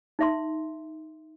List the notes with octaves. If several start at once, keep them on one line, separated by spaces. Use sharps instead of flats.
D#4 E5 C6